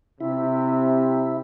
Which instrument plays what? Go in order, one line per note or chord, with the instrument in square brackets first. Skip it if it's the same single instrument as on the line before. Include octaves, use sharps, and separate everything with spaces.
[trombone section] C3 [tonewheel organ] E4